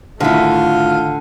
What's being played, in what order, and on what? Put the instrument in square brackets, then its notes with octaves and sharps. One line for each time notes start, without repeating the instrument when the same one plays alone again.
[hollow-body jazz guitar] D2 D#3 E4 [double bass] A2 A3 [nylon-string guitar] D3 [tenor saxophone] F4